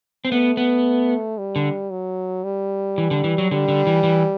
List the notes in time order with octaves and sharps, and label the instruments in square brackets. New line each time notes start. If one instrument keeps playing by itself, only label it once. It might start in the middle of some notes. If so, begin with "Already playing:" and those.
[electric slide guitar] C4
[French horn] A3 [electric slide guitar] B3
[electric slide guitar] B3
[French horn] G3
[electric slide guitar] D3
[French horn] F#3
G3
[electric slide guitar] E3
D3
E3
F#3
[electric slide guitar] D3 [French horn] G3
[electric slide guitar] D3
E3
E3